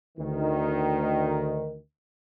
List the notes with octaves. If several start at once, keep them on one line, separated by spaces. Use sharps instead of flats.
D2 D#3